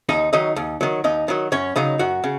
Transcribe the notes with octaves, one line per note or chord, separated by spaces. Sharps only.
D#2 D#4 D#5
D#3 F#3 D#4 D#5
D#2
D#3 F#3
D#2 D#4 D#5
D#3 F#3
F#2 C#4 C#5
C#3 F#3 D#4 D#5
F#2 F#4 F#5
C#3